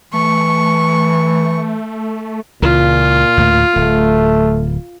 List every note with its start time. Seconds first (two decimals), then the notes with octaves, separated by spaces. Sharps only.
0.13 E3 A3 C#6
2.62 C#2 A#2 C#3 E3 F4
3.37 D2 A2
3.76 D1 A3